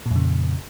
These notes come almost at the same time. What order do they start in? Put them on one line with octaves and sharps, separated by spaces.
A#2 F2 C#3